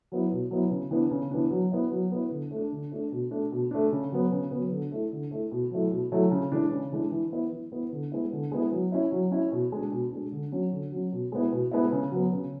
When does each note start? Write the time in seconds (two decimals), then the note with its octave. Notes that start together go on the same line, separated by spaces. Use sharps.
0.12 F#3 B3 E4
0.32 B2
0.51 F#3 B3 E4
0.71 C#3
0.91 E3 B3 D4
1.11 C#3
1.31 E3 B3 D4
1.51 F#3
1.72 B3 E4
1.92 F#3
2.11 B3 E4
2.31 D3
2.51 A3
2.56 D4
2.72 D3
2.92 A3 D4
3.12 B2
3.31 A3 D4
3.52 B2
3.71 A3 D4
3.92 C#3
4.12 F#3 B3
4.32 C#3
4.51 F#3 B3
4.71 D3
4.91 A3 E4
5.12 D3
5.31 A3 E4
5.52 B2
5.71 F#3 A3 E4
5.91 B2
6.12 F#3 A3 E4
6.31 C#3
6.52 E3 G#3 D4
6.71 C#3
6.92 E3 G#3 D4
7.11 E3
7.32 B3 E4
7.52 E3
7.72 B3 E4
7.92 D3
8.12 G#3 B3 E4
8.32 D3
8.51 G#3 B3 E4
8.72 F#3
8.92 C#4 E4
9.12 F#3
9.31 C#4 E4
9.52 B2
9.72 G#3 D4
9.92 B2
10.12 G#3 D4
10.32 D3
10.52 F#3 C#4
10.72 D3
10.92 F#3 C#4
11.12 B2
11.32 G#3 B3 E4
11.52 B2
11.72 G#3 B3 E4
11.92 C#3
12.12 F#3 B3
12.33 C#3